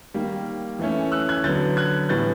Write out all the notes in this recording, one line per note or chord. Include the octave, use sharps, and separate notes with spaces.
D#3 G3 A#3
E3 A3 C#4
E6 F#6
F#6 G#6
D3 F#3 B3 G6 A6
F#6 G#6
A2 E3 G3 B3 G6 A6